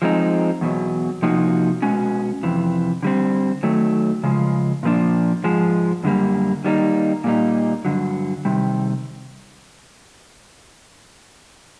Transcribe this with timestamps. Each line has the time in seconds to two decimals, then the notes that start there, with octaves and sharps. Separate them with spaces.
0.02 F3 G#3 C4 D#4
0.61 E2 B2 F#3
1.22 C3 F3 A#3 D#4 F#4
1.82 B2 G#3 C#4 F#4
2.43 F2 C3 E3
3.03 D3 G3 C4
3.63 D#3 F#3 A3
4.24 C#3 F3 G#3
4.83 A#2 F3 A#3 D4
5.44 G#2 F3 G#3
6.04 F#2 D3 G3 A#3
6.64 D#3 G3 A#3 D#4
7.24 A#2 G3 A#3 D#4
7.85 G2 D3 F#3
8.45 C3 D#3 G3